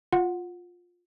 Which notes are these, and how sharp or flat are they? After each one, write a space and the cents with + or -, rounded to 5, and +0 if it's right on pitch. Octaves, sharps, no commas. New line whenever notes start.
F4 +15 F#5 -10